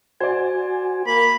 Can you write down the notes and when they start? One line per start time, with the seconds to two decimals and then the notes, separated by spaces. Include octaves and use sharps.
0.20 F#4 C5 D5 G#5
1.06 A#3 B5